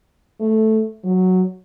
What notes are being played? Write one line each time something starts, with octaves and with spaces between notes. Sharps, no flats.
A3
F#3